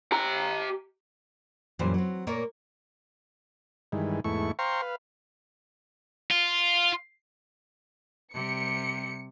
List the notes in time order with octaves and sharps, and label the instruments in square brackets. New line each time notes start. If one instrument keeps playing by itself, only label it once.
[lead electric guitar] G4 A#5
[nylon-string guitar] F#2 A#2 E3 G3 C5
F#3 C4
A#2 A#3 A#4 C#5 D5
[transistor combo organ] G2 D#3 E3 G#3
E2 G#2 A3 E4 C#6
C5 F5 G5 A#5 C6 C#6
B4 F5
[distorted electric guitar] F4
[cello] C3 G3 [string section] C#7